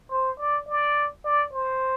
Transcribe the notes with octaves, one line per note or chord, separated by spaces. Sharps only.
C5
D5
D5
D5
C5